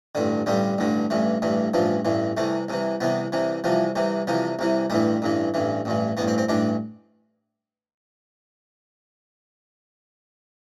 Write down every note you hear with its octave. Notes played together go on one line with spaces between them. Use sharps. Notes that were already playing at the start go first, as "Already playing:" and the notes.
A1 G2 D3
A1 G2 D3 G3
A1 G2 D3
A1 G2 E3
A1 G2 E3
A1 G2 E3 F3
A1 G2 E3
C2 C3 E3 A3
C2 C3 E3
C2 C3 E3 B3
C2 C3 E3
C2 C3 E3 F3
C2 C3 E3
C2 C3 E3 F3
C2 C3 E3
A1 G2 E3 G3
A1 G2 E3
A1 G2 E3
A1 G2 E3
A1 G2 E3 B3
C4
C4
A1 G2 E3 D4